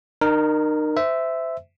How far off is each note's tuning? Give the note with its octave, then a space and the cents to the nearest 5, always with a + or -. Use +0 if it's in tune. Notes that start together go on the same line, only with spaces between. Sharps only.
D#4 -35 A#4 +0
C5 -25 E5 +0